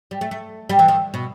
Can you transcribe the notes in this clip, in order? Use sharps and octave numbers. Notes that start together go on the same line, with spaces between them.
G3
A3
A3
G3
E3
D#3
B2